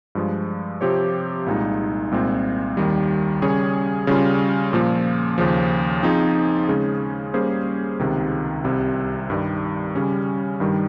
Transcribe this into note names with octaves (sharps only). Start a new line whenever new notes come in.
G2 F3 G#3
C3 F3 C4 G4 C#5
C2 A#2 G#3 D#4
C2 A#2 G#3 C4
D#2 D#3 G3
C#3 G3 C#4 G#4 C#5
C#3 G3 C#4 F4
A#2 F3 A#3
D#2 C#3 F3
F3 C4 D#4 G#4
C#3 G#3 C#4 G#4
G3 A#3 C#4 G#4 C5
C#2 C3 D#3
C2 C3 G3
G2 D#3 G3
C#3 G3 C#4
G2 D#3 G3